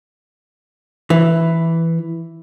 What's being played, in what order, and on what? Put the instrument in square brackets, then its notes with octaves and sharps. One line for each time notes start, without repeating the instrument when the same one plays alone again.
[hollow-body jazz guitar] E3